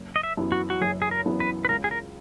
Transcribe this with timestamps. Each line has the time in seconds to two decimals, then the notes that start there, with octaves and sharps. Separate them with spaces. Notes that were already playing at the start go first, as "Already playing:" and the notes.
Already playing: F#1
0.16 D#5
0.23 E5
0.37 F#2 E3 B3 E4
0.52 F#4
0.70 F#4
0.81 F#1 G#4
1.02 G#4
1.11 A#4
1.25 F#2 E3 B3 E4
1.40 B4
1.65 B4
1.69 C#2 A#4
1.84 G#4
1.91 A#4